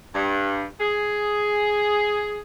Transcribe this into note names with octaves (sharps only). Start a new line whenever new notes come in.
G2
G#4